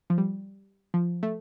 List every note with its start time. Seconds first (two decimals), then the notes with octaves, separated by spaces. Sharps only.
0.10 F3
0.18 G3
0.94 F3
1.23 A3